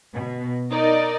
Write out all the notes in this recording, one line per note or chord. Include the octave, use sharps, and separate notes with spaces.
B2
D#4 A#4 D5 D#5